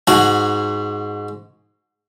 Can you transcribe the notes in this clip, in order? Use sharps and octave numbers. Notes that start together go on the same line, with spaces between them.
G#2 F#4 G#4